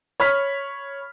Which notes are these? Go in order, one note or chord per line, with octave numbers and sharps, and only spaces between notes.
C#5 B5 F6 B6